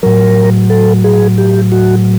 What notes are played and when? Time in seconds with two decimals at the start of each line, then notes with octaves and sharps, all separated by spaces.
0.03 A2 F#3 A#4
0.70 A4
1.04 G#4
1.38 G4
1.72 F#4